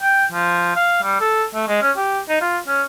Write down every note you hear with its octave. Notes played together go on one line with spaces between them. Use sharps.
G5
F3
F5
G3
A4
A3
G#3
C#4
G4
D#4
F4
C#4